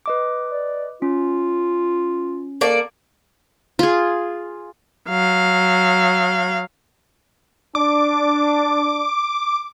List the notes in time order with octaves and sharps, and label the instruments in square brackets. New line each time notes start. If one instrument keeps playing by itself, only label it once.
[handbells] B4 D#5 D6
[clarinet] D5
[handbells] C#4 [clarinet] F4
[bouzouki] A#3 A4 D5
[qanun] F4 G#4
[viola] F#3 F5
[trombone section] D4 [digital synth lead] D6